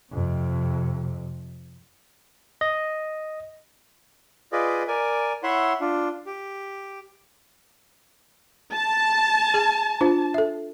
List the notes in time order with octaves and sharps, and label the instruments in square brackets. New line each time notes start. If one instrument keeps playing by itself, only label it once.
[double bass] F2 C3
[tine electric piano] D#5
[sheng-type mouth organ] F4 G#4 B4 D5 D#5
A#4 D5 G#5
E4 C#5 E5 F#5 C6
D4 F4
G4
[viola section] A5
[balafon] G#4
D4 F4 C5
A4 E5